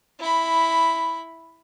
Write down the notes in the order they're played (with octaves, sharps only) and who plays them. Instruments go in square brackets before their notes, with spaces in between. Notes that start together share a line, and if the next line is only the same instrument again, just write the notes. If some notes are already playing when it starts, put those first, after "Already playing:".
[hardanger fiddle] E4 B5